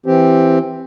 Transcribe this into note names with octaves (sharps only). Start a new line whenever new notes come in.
E3 C4 G4